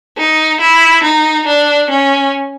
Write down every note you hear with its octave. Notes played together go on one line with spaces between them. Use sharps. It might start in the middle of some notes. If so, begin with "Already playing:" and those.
D#4
E4
D#4
D4
C#4